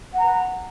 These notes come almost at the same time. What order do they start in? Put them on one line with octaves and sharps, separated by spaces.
F#5 A#5 B4